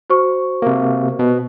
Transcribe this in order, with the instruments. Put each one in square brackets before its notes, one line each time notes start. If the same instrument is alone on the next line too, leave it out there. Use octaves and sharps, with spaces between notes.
[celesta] F#4 C5 C#6
[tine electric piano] C3 A#3
B2